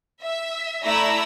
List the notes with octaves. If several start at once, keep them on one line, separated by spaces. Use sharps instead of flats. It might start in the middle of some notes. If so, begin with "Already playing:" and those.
E5
A3 E4 D5 E5 A#5 E6